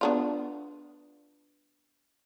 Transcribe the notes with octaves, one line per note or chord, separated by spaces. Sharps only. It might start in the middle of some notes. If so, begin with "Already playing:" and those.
B3 D4 F4